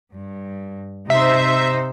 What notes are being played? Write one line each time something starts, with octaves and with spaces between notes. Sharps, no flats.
G2
C3 D#4 C5 E5